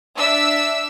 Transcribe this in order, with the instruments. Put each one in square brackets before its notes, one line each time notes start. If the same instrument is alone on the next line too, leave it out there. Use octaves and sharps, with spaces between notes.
[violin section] D4 E5 E6